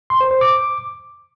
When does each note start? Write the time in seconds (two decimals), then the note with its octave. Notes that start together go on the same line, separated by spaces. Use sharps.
0.10 C6
0.21 C5
0.31 C5
0.41 D6